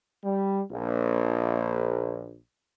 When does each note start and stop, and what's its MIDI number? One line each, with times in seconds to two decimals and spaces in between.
0.24 0.61 55
0.71 2.38 34